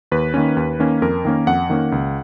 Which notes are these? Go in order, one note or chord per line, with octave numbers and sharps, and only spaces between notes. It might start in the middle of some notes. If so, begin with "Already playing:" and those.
D#2 B4
D#3 A#3 C#4
D#2
D#3 A#3 C#4
F2 A#4
D#3 A#3 C#4
F2 F#5
D#3 A#3 C#4
C#2